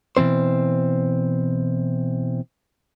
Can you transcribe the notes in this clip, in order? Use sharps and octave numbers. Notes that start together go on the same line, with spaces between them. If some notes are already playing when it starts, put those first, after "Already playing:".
B2 E3 F3 C4 C5